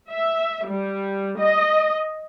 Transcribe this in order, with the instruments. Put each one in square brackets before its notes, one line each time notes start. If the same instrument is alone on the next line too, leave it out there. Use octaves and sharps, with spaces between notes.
[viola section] E5
G3
D#5